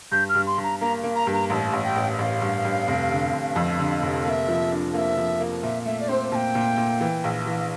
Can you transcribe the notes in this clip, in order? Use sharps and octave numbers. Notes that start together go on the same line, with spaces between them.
G2 G6
F6
G2
C6
G2
A#5
A#3 A#5
A#3
A#5
G2
A#5
A1 A5 A#5
A1
G5
A1
A1 F5
G2
G2
F1
D3
F1
F2
D3
F1
A#3 E5 F5
F3
D4
A#3 E5 F5
F3
A#3
A#2 E5
A3 E5
D5
C4 C5
A#2 G5 A5
A#2
A#2
E3
A#1
E3